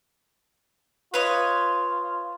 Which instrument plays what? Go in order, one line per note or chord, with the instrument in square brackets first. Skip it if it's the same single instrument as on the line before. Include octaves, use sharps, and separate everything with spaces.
[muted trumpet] F4 [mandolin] B4 C#5 D#5